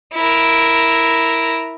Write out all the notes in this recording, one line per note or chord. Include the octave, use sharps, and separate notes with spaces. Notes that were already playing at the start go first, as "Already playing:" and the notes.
E4 A#4